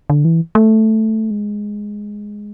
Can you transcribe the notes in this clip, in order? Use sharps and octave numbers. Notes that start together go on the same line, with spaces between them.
D3
E3
A3
G#3